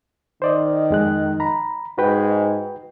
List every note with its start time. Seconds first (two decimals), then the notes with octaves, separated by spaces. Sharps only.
0.42 D#3 C5 D5 D#5
0.90 F2 G#3 F#6
1.40 A#5 B5
1.98 G#2 F#4 B4 G5